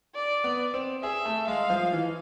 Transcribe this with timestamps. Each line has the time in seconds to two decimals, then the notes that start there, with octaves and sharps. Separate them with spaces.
0.15 D5
0.44 B3
0.74 C4
1.03 G#4 E5
1.25 A3
1.48 G#3 F5
1.70 F3
1.93 E3